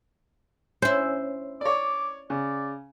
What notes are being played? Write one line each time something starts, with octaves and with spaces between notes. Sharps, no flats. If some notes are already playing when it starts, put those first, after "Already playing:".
C#4 E4 C5
C#5 D5 D6
C#3 D5